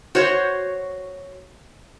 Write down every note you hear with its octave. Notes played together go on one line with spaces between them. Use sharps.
F#4 C5 C#5